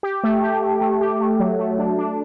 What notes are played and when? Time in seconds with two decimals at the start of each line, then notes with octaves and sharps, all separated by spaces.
0.03 G4
0.23 A3
0.43 G4
0.62 A3
0.81 A3
1.01 G4
1.20 A3
1.40 F#3
1.59 A3
1.79 D4
1.98 D4